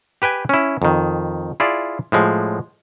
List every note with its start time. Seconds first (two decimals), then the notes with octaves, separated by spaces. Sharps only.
0.22 G4 B4 G5 G#5
0.49 C#4 E4
0.82 F2 D#3
1.60 E4 F4 G#4 D5
2.12 A2 F3 G#3